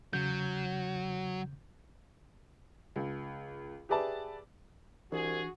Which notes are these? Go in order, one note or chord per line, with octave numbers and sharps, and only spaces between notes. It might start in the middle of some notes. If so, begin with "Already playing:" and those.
E2 C#3 F#3 G6
C#2
G4 G#4 B4 D5 E5 A5
C2 E3 D4 F#4 G#4